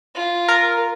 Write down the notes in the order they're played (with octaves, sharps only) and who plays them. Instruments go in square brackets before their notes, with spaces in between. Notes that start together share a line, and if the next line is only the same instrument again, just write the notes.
[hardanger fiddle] F4
[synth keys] A#4